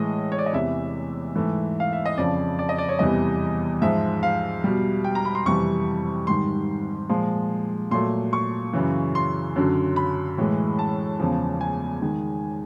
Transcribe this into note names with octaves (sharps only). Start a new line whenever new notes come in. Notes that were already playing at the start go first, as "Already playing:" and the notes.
Already playing: A2 E3 G#3 D#5
C#5
D5
D#5
E2 C3 E3 E5
G#2 E3 A3
F5
E5
D#5
F2 C#3 F3 D5
D5
D#5
D5
C#5
E2 C3 E3 G3 D#5
G#2 F3 G#3 E5
F5
B2 G3
G5
A#5
B5
C6
F2 C3 E3 G3 C#6
G#2 D#3 G3 C6
A#2 F3 G#3 C6
A#2 F#3 A3 C6
C#6
F#2 C#3 E3
C6
F#2 D3 F#3
B5
A2 E3 G#3
A5
E2 C#3 F3
G#5
D#3 G#3